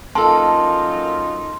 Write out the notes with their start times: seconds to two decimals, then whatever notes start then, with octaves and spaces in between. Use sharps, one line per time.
0.15 F#2 A#3 D#4 F4 A4 A5 C6